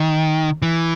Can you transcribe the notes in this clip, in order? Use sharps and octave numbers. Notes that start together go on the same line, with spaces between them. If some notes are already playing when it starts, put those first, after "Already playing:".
Already playing: D#3
E3